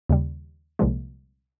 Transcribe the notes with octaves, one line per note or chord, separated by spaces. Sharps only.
D#2 C#3 G3
C2 A#2 F3 G#3